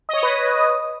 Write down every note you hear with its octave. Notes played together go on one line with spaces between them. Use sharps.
B4 C#5 D#5 D#6